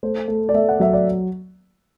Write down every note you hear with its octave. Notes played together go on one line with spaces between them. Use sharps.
A3 C5
A3
D5
A3 E5
F#5
F#3 E5
D5